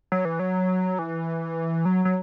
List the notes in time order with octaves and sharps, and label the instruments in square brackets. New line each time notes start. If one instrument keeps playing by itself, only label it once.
[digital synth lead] F#3
E3
F#3
E3
F#3
F#3